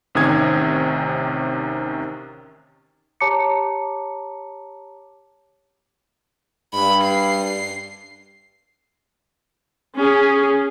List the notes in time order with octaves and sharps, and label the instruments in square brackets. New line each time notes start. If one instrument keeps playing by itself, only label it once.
[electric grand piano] A1 C3 D#3 C#4 D#6 G#6
[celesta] G4 C#5 A5 A#5 D6 C#7
[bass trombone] G2 [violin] B5
[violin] C7
[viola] C#4 G#4